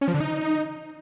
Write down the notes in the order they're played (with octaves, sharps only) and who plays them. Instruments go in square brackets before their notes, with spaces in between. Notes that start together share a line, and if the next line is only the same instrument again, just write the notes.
[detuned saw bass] C#4
F3
D3
D#4